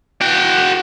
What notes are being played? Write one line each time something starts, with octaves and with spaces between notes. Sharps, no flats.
F#4 G5